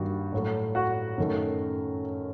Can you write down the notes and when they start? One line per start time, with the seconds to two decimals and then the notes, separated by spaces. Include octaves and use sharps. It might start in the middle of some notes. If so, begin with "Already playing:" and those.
Already playing: G2 D#3 G3 A#3 F#4
0.32 A2 F#3 A3
0.75 F#4 F#5
1.18 F#2 D#3 A3